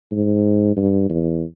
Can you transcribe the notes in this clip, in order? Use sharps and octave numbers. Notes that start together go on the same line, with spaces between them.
G#2
G2
E2